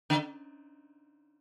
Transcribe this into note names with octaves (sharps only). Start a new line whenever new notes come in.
D3